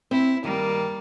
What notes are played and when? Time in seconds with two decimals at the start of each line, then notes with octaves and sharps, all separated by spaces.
0.11 C4 E4
0.44 D#3 G3 A#3